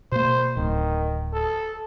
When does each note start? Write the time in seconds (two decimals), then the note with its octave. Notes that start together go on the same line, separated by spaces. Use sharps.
0.12 B2 A#3 C5
0.57 D1 D#3
1.33 A4